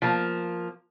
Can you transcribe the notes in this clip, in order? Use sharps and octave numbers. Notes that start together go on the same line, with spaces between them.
F3 A#3